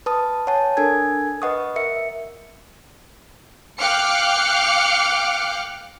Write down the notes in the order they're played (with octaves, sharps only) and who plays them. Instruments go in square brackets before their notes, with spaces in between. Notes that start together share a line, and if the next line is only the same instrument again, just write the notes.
[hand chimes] B4 A5 D#6
C#5 F#5 G#5 A5
D4 A4 A#4 G#5 G#6
B4 D#5 F#5 C#6 D#6
A#4 E5 C#7
[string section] F5 G5 D6 F6 F#6 C#7